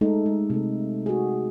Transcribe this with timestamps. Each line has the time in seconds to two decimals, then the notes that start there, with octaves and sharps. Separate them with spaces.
0.01 G#3 A3 D#4 A4
0.26 G#3
0.50 C3 A3
1.06 F#4 G#4